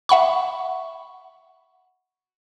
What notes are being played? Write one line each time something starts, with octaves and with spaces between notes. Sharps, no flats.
E5 F#5 B5 C#6